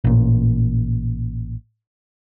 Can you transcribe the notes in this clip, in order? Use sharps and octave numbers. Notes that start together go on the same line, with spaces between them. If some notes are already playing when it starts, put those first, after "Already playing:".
A1 A#2